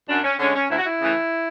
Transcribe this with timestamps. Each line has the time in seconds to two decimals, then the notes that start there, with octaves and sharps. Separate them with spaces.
0.09 F#2 D4
0.24 C#4
0.39 D3 G#3 C#4
0.55 C#4
0.70 D2 E4
0.78 F#4
0.85 E4
1.00 C#3 E3 A3